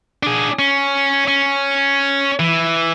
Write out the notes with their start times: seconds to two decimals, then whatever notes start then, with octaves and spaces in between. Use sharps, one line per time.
0.23 D4 G#4
0.59 C#4
1.28 C#4
2.40 E3